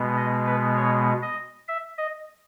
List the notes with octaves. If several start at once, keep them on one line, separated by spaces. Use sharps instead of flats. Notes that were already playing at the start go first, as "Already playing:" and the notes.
Already playing: B2 G#3 B3
D#5
B4
C#5
D#5
E5
D#5